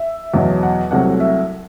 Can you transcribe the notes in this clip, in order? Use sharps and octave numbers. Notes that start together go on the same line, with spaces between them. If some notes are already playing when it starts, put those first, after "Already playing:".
Already playing: E5
E2 B2 F#3
F#5
C2 C3 F#3 A3 F#5
E5